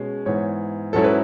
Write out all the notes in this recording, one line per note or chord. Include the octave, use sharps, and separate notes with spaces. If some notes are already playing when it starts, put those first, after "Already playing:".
Already playing: B2 G#3 C#4
G#2 E3 B3 C#5
G#2 F#3 C#4 E4 A4
B4